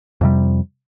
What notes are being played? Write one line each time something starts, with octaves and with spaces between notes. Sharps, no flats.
F2 C3 G3